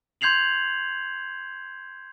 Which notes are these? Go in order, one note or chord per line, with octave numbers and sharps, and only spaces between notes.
C6 G6 G#6 C7 F7 F#7